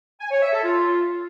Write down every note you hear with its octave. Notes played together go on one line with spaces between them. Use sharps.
G#5
C#5
E5
A4
F4